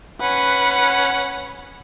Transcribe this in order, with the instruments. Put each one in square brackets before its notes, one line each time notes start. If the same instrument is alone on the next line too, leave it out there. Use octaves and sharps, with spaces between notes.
[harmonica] C#4 F#5 [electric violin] B4